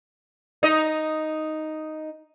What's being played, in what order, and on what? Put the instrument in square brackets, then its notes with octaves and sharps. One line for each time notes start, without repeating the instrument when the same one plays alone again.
[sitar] D#4 D#5